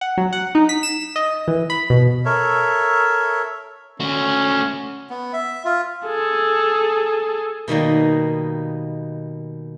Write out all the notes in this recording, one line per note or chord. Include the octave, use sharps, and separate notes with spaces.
F#5
F#3
F#5
D#4
B6
E7
D#5
E3
B5
B2
A4 A#4 C#5 E5
A3 C#4 F#4
B3
E5
F4
G#4 A4
B2 D#3 G3 A#3